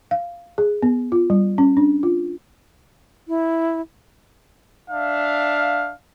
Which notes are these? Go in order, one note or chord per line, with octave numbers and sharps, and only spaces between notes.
F5
G#4
B3
F4
G3
C#4
D4
F4
E4
D4 E5 F5